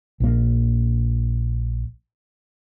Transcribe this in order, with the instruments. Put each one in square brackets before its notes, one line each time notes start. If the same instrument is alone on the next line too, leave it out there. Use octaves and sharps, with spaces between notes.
[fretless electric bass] A#1 A#3